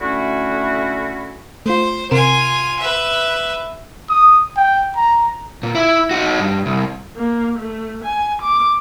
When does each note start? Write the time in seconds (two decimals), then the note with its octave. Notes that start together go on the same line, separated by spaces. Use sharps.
0.01 D3 A3 C#4 E4 F#4
1.66 A3 F4 C5
2.11 C3 F4 A#4 G#5 E7
2.79 B4 E5
4.10 D#6
4.57 G5
4.97 A#5
5.63 A#2
5.75 E4
6.11 D#4 F#4
6.39 G2
6.66 C2
7.16 A#3
7.59 A3
8.04 G#5
8.42 D6